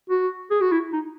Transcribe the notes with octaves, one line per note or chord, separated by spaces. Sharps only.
F#4
G#4
F#4
E4
D#4